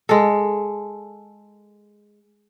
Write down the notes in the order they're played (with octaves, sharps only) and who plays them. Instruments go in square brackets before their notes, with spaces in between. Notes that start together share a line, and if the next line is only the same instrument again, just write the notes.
[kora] G#3 A4